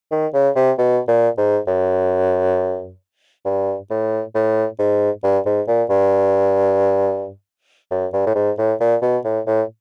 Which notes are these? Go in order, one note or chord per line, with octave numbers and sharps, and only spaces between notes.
D#3
C#3
C3
B2
A#2
G#2
F#2
G2
A2
A2
G#2
G2
G#2
A#2
G2
F#2
G2
A2
G#2
A2
A#2
B2
A2
A2